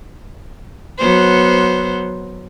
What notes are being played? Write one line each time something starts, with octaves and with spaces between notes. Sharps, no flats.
F#3 B3 C5